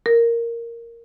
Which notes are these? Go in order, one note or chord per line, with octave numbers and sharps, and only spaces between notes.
A#4